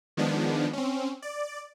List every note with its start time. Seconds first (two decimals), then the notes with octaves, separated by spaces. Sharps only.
0.17 D#3 F3 G#3 B3 D4
0.73 C4 C#4
1.22 D5